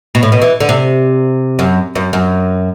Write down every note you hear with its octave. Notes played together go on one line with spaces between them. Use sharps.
B2
A2
B2
E3
D3
C3
F#2
F#2
F#2